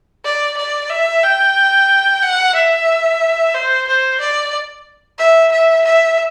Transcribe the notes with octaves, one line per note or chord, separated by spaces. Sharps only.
D5
D5
E5
G5
F#5
E5
C5
C5
D5
E5
E5
E5